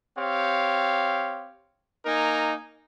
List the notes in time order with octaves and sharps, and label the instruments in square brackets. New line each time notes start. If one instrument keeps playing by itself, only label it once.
[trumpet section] C4 G4 C#5 F5
A#3 D#4 A#4 G#5